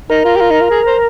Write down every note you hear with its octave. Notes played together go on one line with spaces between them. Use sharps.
D#4 A#4
F4
G4
F4
D#4
F4
G#4
C5